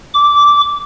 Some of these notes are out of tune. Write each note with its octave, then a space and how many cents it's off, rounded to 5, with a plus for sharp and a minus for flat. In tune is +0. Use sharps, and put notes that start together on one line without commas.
D6 -10